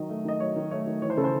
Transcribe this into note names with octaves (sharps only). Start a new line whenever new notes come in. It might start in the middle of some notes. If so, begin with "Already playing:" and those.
Already playing: D#3 F#3 D#5
A3
D#3 D#5
F#3 C#5
D#3
A3 C#5
D#3
E3 C#5
C5
C#3 A4
C5